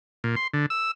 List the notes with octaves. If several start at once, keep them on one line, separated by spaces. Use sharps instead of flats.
A#2
C6
D3
E6